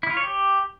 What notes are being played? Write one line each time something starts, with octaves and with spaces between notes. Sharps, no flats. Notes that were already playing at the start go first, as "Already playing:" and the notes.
E4
F4
C#5
G4